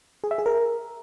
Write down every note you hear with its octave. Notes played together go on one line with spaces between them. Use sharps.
G#4
E5
G#4
A#4